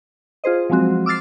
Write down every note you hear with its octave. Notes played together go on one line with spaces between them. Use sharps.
F4 G#4 C5 D#5
F3 F#3 G#3 C4 F#4
D6 E6 F6 A6 C7